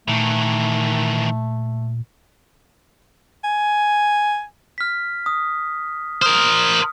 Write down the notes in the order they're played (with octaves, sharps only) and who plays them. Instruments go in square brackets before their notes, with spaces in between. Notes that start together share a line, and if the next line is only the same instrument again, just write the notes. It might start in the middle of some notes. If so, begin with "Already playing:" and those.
[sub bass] A#2 [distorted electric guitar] D#3 E3 [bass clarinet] A3
[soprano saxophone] G#5
[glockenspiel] F6 B6
D#6
[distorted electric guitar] A#4 C5 [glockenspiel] D#6 F6